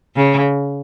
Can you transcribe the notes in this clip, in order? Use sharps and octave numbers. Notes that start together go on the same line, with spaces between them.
C#3